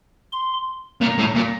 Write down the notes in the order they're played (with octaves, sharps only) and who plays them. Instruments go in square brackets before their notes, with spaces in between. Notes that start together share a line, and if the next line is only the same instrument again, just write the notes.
[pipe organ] C6
[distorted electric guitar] A#2 [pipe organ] A#5
[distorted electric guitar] A2
A#2